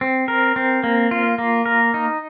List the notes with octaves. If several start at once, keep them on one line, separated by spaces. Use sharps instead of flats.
C4
A#4
C4
A#3
F4
A#3
A#4
D#4